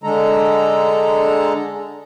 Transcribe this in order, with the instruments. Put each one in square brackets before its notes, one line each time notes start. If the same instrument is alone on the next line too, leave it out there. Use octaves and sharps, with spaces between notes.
[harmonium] D3 G#3 A4 A#5